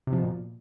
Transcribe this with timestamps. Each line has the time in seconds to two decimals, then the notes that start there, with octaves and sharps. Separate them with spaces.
0.07 C3
0.13 F3
0.18 B2
0.24 A#2